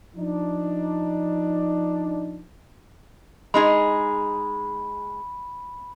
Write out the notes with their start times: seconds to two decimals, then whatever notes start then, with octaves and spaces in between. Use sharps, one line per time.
0.16 F3 D4 D#4
3.54 G#3 D#4 G#4 B5